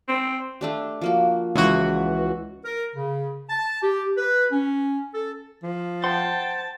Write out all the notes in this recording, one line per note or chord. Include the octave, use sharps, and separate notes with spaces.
C4
A3 D4 G4
F3 A#3 F#4
C#2 E3 F#4 C#5 D#5
A#4
C#3
A5
G4
B4
C#4
A4
F3
C5 F#5 G5 A5 C6